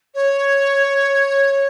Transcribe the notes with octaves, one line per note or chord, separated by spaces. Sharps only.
C#5